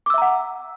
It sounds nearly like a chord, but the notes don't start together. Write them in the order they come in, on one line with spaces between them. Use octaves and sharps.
D6 E6 E5 A#5 F#5